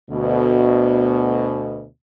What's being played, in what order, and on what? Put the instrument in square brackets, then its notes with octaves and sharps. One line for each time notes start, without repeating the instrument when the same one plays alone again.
[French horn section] D2 B2